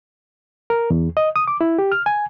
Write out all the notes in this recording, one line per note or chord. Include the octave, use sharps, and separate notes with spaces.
A#4
E2
D#5
D#6
D6
E4
G4
F6
G#5